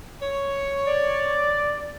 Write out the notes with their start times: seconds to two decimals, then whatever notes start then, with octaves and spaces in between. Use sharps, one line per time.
0.22 C#5
0.87 D5